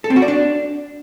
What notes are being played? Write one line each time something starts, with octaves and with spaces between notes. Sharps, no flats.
A4
C4
F#4
D5
D4